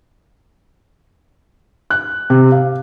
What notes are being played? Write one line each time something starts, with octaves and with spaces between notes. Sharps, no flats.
F#6
C3
F5